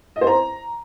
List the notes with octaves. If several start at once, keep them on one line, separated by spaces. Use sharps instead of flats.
D#5
C5
A#5